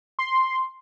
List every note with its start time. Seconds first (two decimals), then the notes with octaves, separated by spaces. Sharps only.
0.19 C6